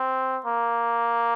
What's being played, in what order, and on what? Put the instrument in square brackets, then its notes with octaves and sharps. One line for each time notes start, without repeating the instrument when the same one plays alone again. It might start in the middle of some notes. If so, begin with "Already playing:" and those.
Already playing: [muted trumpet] C4
A#3